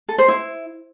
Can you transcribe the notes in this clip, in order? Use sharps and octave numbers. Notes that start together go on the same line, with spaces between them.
A4
C5
E4